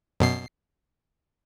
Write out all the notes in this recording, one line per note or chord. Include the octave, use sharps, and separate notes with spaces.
F#2 B2 C7